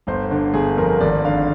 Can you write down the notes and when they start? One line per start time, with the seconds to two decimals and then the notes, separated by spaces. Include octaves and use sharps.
0.07 G1 C5
0.31 D3
0.54 G1 G#4
0.77 F2 A#4
1.00 G#1 D5
1.24 D3 F5